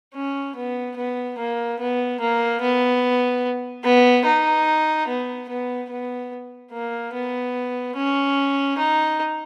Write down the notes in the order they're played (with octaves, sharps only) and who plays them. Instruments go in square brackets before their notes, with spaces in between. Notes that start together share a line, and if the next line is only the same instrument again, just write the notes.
[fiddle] C#4
B3
B3
A#3
B3
A#3
B3
B3
D#4
B3
B3
B3
A#3
B3
C#4
D#4